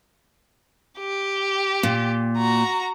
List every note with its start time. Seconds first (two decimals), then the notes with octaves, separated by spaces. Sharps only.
0.99 G4
1.83 A#2
2.37 F#4 A#5